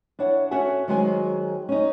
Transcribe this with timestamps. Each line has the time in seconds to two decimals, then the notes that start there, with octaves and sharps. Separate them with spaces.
0.19 D4 E4 C#5 F#5
0.51 C#4 F#4 A4 E5 F#5 G#5
0.88 D#3 F#3 G#3 C5 C#5 G#5
1.69 C#4 D#4